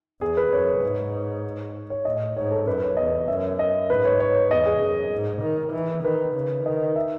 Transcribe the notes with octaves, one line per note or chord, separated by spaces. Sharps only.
E2 G#4
B4
F#2 C#5
G#2
C#5
A2 D#5
G#2 C#5
A4
F#2 B4
C#5
E2 D#5
F#2 E5
D#5
G#2 B4
C#5
C#5
E2 D#5
G#4
F#2
G#2
D#3
E3
D#3 B4
C#3
D#3 D#5
E5